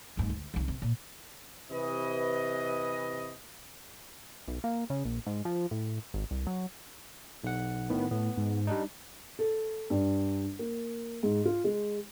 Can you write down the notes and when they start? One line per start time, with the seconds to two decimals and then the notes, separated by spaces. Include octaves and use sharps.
0.17 F#1 G#2
0.30 D2
0.54 C2 D#3
0.68 C3
0.82 A#2
1.70 C3 E3 B4 D#5
4.48 B1
4.64 A#3
4.90 C#3
5.05 A#1
5.26 G#2
5.45 F3
5.71 A2
6.14 G#1
6.31 C2
6.47 F#3
7.44 B1 F#5
7.90 A2 D#3 B3
8.11 A2 B3
8.38 G#2
8.67 G3 D4 D#4
9.39 A4
9.90 G2
10.59 A#3
11.23 G#2
11.45 F4
11.64 G#3